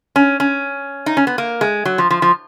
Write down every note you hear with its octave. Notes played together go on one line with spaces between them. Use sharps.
C#4
C#4
D#4
C#4
B3
A#3
G#3
F#3
F3
F3
F3